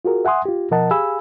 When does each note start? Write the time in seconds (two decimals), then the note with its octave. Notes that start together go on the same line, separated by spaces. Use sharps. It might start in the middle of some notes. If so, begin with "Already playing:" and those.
0.05 F4 F#4 G#4 A#4
0.25 E5 F#5 G#5 C6 D#6
0.45 F4 G4
0.71 B2 F3 A#4 D#5 F#5 A5
0.91 G4 G#4 F5 G#5 B5 E6